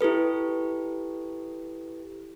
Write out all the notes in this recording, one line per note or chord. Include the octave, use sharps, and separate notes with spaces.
E4 G4 A4 B4